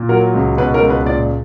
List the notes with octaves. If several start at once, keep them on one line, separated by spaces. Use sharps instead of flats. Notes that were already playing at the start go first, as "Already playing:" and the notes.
Already playing: A#2
F#3 A#4
C#2
B2 B4
A#4
C#2
B4
A#2 D5